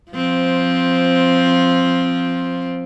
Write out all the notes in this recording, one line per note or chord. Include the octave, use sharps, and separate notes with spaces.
F3 C4